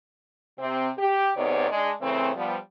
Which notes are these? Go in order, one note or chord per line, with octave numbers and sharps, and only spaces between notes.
C3 C4
G4
G#2 C3 D#3 B3 C#5 D5
G#3 D4
C#3 E3 A3 C4
F3 G3 B3